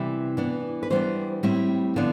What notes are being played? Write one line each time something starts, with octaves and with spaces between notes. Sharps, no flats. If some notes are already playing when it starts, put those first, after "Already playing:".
Already playing: C3 E3 G3 E4
E3 B3 D4
B4
E3 G3 B3 D4 C5
A2 G3 C4 E4
D3 F3 B3 D4